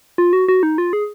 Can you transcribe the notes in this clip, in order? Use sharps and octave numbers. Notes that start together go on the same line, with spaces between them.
F4
F#4
F#4
D#4
F4
G#4